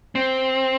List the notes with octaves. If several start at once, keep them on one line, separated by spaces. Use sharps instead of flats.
C4